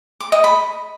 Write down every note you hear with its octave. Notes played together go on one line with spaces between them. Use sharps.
D6
D#5
B5